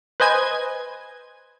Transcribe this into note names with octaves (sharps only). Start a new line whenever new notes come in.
B4 C5 D#5 G#5 G#6